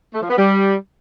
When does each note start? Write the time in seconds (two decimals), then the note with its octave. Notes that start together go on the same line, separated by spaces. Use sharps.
0.13 A3
0.21 F3
0.29 B3
0.37 G3